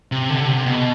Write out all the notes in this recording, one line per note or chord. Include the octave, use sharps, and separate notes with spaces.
C3
D3
C3
B2